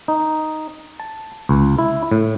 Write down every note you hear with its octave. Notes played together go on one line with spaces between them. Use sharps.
D#4
A5
C#2
E4
A2